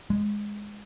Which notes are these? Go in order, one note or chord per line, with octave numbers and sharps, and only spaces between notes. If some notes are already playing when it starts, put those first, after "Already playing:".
G#3